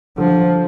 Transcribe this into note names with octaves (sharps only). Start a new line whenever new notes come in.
D3 F3